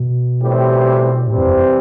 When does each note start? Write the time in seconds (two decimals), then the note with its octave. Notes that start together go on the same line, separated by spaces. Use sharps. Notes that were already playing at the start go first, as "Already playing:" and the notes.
Already playing: B2
0.41 A2 E3 G3 C4 G4
1.27 A2 C3 E3 G3 C4
1.38 F2
1.49 F2